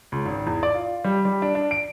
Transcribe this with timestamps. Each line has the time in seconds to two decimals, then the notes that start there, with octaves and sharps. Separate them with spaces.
0.12 C#2
0.26 G#1
0.47 E2
0.63 D5
0.75 F4
1.05 G3
1.25 G3
1.42 D4
1.55 D4
1.71 D7